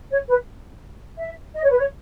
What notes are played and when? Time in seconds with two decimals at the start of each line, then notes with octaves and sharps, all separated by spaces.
0.11 C#5
0.29 B4
1.19 E5
1.55 D#5
1.63 C#5
1.70 B4
1.78 C#5